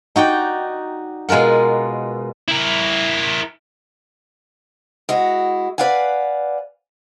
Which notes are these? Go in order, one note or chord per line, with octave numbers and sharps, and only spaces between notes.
D#4 F#4 D5 G5
B2 G#3 F4 A#4 F#5
E4 A#4
G#3 E4 F#4
B4 D5 F5 F#5 G#5